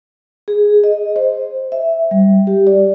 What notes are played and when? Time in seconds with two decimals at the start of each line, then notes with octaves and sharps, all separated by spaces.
0.48 G#4
0.84 D#5
1.16 C5
1.72 E5
2.11 G3
2.47 G4
2.67 D5